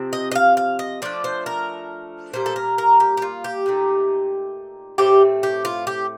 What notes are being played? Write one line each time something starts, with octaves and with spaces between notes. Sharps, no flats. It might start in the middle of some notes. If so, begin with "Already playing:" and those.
Already playing: C3 F3 C4
D#5
D#5
F5
F5
D#5
F3 A3 D4 D5
C5
A#4
A#2 G3 A#3 C5
A4
A#4
A#4
G4
G4
F4
G4
A#2 A3 D#4
A2 A3 C4 G4
G4
F4
G4